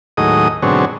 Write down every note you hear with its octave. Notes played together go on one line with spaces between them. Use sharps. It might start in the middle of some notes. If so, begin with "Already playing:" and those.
D#2 A2 F#3 G#3 D#5 D#6
G#2 B2 D3 F#3 C4 C#5